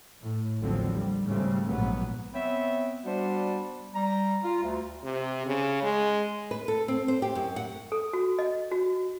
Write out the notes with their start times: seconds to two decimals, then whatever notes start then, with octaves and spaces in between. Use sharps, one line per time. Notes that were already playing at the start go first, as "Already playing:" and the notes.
0.21 A2
0.60 A1 D#2 D3 F3 F#3 C4
0.93 G3
1.25 G#1 G#2 C#3 G3 A3 C4
1.66 A#1 G#2 F#3 B3
2.34 B3 C4 C#5 E5
3.05 G3 B3 D4 F#4 C5
3.94 G3 A#5
4.43 F4
4.62 D2
5.04 C3
5.46 C#3
5.83 G#3
6.51 B4
6.68 A4
6.88 C4
7.08 C5
7.22 G4
7.35 F#2
7.56 F#5
7.92 A4
8.13 F#4
8.39 D#5
8.71 F#4